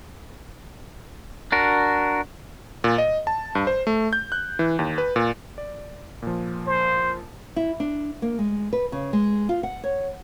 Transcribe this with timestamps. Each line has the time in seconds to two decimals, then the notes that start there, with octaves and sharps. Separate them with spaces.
1.52 D4 F#4 A#4
2.84 A#2
2.98 D#5
3.27 A5
3.55 G2
3.67 C5
3.87 A3
4.13 G6
4.32 F#6
4.59 E3
4.79 D#2
4.98 B4
5.16 A#2
5.58 D5
6.22 A#2 F3
6.67 C5
7.56 E4
7.80 D4
8.22 A#3
8.39 G#3
8.73 B4
8.92 C#3
9.13 G#3
9.49 F4
9.63 F#5
9.84 C#5